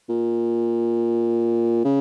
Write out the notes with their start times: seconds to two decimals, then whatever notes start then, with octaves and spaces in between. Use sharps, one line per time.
0.09 A#2
1.85 C#3